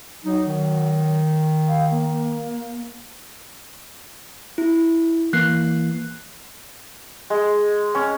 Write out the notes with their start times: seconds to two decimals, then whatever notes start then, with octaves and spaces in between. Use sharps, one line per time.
0.24 F#3 D#4
0.45 D#3
1.68 F5
1.91 A#3
4.58 E4
5.33 E3 A#3 F#6 C7
7.30 G#3
7.95 C#4